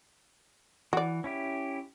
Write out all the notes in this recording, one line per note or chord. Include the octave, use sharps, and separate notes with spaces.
E3 F#4 D5
C#4 E4 G4